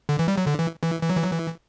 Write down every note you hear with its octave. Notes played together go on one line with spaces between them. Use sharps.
D3
E3
G3
F#3
D3
E3
E3
E3
F#3
E3
F#3
E3